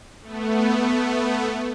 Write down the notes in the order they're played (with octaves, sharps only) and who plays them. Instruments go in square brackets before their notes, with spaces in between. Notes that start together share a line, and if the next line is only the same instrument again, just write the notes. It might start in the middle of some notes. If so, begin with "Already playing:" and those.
[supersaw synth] A3 B3